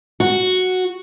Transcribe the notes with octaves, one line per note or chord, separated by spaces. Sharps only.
F#4